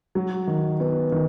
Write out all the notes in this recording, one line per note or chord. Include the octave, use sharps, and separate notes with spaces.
F#3
D#3
B3
D#3